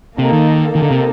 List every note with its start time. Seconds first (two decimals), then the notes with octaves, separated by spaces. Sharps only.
0.18 C3 A#3 D#4 A4
0.33 D#3
0.74 D#3 A#3 D#4 A4
0.82 D3
0.91 C3